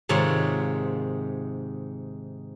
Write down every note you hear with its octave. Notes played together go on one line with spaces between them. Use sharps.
G#2 C3 D#3 F4 C#5